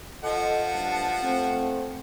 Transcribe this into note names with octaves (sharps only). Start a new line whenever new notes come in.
F3 A4 D#5 F#5
G2 A5
A3 C4